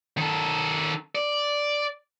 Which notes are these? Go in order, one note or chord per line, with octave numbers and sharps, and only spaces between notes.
D#3 A4
D5